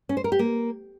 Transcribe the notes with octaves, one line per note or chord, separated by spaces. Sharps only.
C#4
C5
A#4
G4
A#3